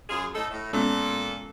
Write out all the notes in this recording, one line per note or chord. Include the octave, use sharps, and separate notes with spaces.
F#2 F4 G#4
A2 D#4 A4
A2
A#2 G#3 B3 C#4 A4